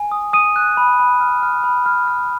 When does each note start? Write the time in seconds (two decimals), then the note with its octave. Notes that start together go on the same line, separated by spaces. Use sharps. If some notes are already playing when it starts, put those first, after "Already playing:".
Already playing: G#5
0.12 D#6
0.33 D#6 D#7
0.56 F#6
0.77 B5
0.99 B5
1.21 F6
1.43 F6
1.64 B5
1.86 F6
2.08 F6